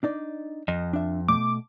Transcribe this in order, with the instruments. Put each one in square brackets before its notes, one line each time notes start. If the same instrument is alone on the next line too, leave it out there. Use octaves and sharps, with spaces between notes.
[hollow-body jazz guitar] D4 D#4 D5
[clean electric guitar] F2 [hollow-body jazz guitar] D#5
[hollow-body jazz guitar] D4 E5
[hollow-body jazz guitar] B2 A3 [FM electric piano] D6